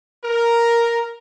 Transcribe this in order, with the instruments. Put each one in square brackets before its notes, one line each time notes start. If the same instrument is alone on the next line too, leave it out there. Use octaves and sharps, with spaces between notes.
[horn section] A#4